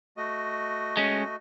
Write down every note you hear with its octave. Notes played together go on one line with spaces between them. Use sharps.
A3 F#4 D#5
G#3 C#4